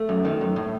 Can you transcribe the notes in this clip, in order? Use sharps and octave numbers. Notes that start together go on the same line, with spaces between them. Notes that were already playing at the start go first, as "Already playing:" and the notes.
Already playing: A3
F#2
D#3
F#2
A2